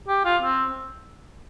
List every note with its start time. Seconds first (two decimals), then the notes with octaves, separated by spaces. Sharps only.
0.08 G4
0.25 F4
0.42 C4